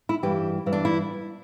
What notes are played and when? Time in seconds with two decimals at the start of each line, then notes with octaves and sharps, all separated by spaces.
0.09 E4
0.23 G2 E3 G4
0.66 G2 E3
0.73 D4
0.85 E4